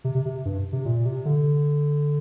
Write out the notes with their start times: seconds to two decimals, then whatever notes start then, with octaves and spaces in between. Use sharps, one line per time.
0.04 C3
0.15 C3
0.25 C3
0.45 G2
0.72 C3
0.85 A#2
1.06 C3
1.25 D3